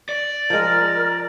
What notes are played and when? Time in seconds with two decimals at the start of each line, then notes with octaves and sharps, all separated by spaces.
0.09 D5
0.50 F3 G#3 A#4